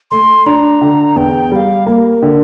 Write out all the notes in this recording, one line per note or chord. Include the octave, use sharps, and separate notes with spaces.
A3 C6
D4 A#5
D3
E2 G5
G3 F5 G5
A#3 A#4
D3